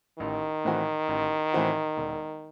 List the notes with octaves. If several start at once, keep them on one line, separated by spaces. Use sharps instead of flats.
A1 D#3
A2 E3 C4 F#4
A1
A2 E3 C4 F#4
E1